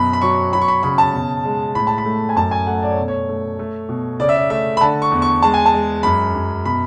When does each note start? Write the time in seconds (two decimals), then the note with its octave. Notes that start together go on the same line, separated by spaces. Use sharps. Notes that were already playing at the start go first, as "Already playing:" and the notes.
Already playing: F#2 B2 B5
0.13 B5
0.21 F#3 C#6
0.53 F#3 B5
0.61 C#6
0.68 B5
0.83 C#3 B5
0.98 A5
1.13 B2
1.45 G#3
1.75 A2 B5
1.87 A5
1.98 B5
2.06 A3
2.29 G#5
2.36 F#2 A5
2.51 G#5
2.67 A3 F#5
2.83 D5
2.91 C#5
2.98 B2
3.08 C#5
3.29 A3
3.59 A3
3.89 B2
4.20 C#3 D5
4.29 E5
4.36 D5
4.50 A3 E5
4.77 B5
4.81 D3 A5
5.02 C#6
5.11 E2
5.22 C#6
5.42 G#3 A5
5.54 G#5
5.66 A5
5.74 G#3
6.03 F#2 B5
6.34 F#2
6.65 B2 B5